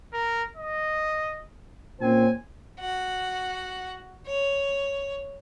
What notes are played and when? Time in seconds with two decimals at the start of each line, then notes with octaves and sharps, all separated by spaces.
0.13 A#4
0.56 D#5
2.01 A#2 C4 C#4 G#5
2.80 F#4 F#5
4.27 C#5